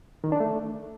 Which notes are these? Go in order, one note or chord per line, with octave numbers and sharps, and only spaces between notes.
D#3
D4
A3